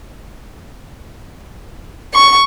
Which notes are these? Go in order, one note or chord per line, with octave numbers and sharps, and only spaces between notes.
C#6